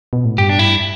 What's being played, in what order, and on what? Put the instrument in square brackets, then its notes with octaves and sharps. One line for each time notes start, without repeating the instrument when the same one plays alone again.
[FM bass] B2
A2
[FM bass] G2 [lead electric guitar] G4
[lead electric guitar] D4
E4